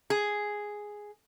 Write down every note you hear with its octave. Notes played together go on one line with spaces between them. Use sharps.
G#4